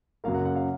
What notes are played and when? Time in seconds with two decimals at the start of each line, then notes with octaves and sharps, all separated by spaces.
0.24 F#2 C#3 F#3 A#3 F5
0.35 F#5
0.45 F#5
0.56 F5